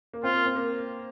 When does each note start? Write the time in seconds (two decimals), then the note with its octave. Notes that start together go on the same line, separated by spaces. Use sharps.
0.13 A#3
0.23 C4 F4
0.34 A#3
0.46 C4
0.56 A#3